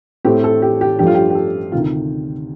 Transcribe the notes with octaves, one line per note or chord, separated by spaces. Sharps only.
A2 A3 C4 G4
A4
G4
G4
G2 F3 A3 G4
F4
G4
G4
A4
D2 C3 D#3 F4